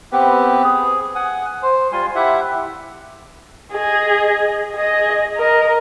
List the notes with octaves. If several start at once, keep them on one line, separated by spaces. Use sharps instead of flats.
B3 C4 G4 B4
G#4
F#5 G#5
C5
G3 F4 G#5 C6
E4 G4 E5 F#5
G#4 D#5
G#4 D#5
A#4 D#5